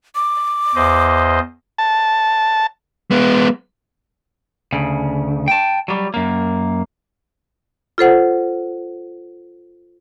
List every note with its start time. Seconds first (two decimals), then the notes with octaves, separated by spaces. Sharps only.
0.15 D6
0.75 E2 C5 D#5
1.78 A5
3.11 G#3 B3
4.72 D2 C#3
5.48 G5 A5
5.88 F#3 G3
6.14 F#2 A#3
7.98 F4 A4 C5 F#5